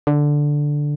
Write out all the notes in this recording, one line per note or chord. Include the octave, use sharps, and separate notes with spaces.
D3